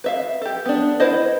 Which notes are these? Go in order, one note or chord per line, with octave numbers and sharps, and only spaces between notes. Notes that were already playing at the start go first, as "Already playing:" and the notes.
B4 E5 F5
G4 A4
B3 D4
E4 B4 C5 D#5